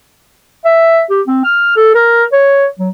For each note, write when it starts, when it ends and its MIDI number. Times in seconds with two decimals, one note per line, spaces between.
0.65 1.03 76
1.10 1.21 67
1.27 1.43 60
1.44 1.74 89
1.76 1.92 69
1.95 2.24 70
2.32 2.67 73
2.79 2.89 54